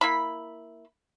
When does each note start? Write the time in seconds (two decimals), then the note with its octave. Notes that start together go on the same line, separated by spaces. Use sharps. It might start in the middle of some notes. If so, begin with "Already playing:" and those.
0.01 A#3 E4 B5